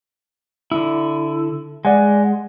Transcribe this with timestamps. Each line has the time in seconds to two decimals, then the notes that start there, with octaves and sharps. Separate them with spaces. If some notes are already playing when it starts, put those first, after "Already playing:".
0.72 D3 E4
1.85 G#3 D5 F#5 G#5